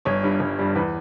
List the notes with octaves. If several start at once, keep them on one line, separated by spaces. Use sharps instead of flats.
G1 C#5
G2 G3
G1
G2 G3
E2 B4